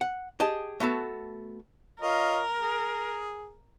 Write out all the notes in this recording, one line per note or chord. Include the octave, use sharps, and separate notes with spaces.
F#5
G4 G#4 D#5 A5
A3 B3 F#4 A4
F4 A#4 C#5 D#5
G#4